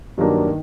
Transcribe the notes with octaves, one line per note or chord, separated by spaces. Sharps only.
G2 D#3 F#3 A#3 D4
D#3